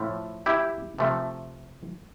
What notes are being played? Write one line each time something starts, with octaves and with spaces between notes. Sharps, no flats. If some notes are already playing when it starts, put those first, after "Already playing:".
Already playing: A2 F3 A3
E4 G4
C3 F3 A3